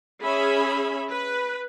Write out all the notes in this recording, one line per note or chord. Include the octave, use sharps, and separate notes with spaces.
C#4 G#4 E5 B5
B4